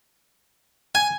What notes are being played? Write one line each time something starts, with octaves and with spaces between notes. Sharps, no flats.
G#5